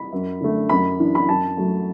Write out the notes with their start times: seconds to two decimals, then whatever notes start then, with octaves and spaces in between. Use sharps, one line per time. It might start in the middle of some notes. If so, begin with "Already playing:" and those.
Already playing: B5
0.12 F#2
0.41 D3 A3
0.69 F#2 B5
0.99 E3 D4
1.15 B5
1.29 F#2 A5
1.57 F#3 A3